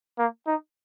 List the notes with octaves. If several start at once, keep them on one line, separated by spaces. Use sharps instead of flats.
A#3
D#4